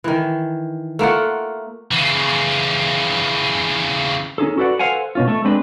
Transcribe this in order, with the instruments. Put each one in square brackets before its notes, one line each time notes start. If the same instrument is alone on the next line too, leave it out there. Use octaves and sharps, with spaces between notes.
[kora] D#3 E3
A3 A#3 F4 F#5
[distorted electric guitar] C#3 E3
[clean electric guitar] C#4 D#4 G#4 A4
F#4 A4 B4 D5 F#5
A4 B4 C5 F5 F#5 G#5
B2 C#4 F4
A3 A4
G#3 C4 D4 B4